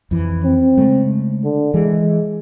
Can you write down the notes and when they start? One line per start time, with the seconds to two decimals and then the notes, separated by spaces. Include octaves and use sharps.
0.11 F2 E3
0.44 C4
0.77 C#3 G#3 A3
1.44 D3
1.74 E3 G#3